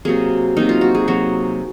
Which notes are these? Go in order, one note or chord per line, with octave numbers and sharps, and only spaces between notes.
C3 F#3 A#3 G#4
C3 F#3 A#3 D#4
F4
F#4
G#4
C3 F#3 A#3 F#4